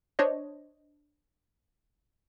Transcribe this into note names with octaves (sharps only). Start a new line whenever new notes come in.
D4 C5 C#5 D#5